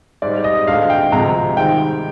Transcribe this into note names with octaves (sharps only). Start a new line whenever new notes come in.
G#2 G3 D5
D#5
D2 D3 G#3 F5
G5
D2 C3 F3 G#3 A#5
G#2 D#3 G3 G5